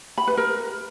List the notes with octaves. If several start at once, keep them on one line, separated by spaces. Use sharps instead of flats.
B5
B4
A#4